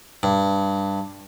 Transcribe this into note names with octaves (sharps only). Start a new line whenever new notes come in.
G2